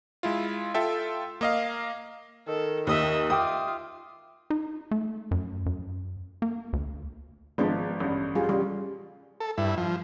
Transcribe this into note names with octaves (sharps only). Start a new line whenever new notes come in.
G#3 E4 F4
F4 A4 E5 G5
A#3 D#5 F5
D#3 A4
D#2 D#5 E5 D#6
F4 E5 G5 D6 D#6
D#4
A3
F#2
F#2
A#3
D2
G#1 F3 G#3 B3 D4
A1 G2
G3 F4 G#4
A1 G3
A4
G2 E4
F3